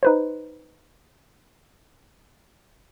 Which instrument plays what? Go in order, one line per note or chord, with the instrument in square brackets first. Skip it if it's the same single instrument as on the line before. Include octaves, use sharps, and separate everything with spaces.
[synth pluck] D#4 B4 C5